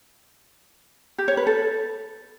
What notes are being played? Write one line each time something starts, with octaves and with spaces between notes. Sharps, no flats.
G4
C#5
B4
A4